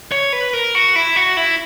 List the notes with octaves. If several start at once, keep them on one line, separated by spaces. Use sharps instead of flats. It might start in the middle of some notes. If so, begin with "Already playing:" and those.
C#5
B4
A#4
F#4
E4
F#4
E4